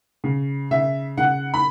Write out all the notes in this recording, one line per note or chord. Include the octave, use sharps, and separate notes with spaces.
C#3
C#3 E5
C#3 F#5
B5